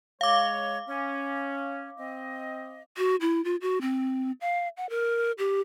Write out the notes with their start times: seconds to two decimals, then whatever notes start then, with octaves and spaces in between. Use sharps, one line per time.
0.21 G#3 C#5 F5 D6
0.88 C#4
1.98 C4 D#5
2.98 F#4
3.21 E4
3.45 F4
3.62 F#4
3.81 C4
4.41 F5
4.77 F#5
4.90 A#4
5.38 G4